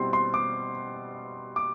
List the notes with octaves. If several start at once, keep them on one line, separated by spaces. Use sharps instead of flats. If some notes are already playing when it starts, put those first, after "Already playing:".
Already playing: B2 G3 C4 E4 C6
C6
D6
D6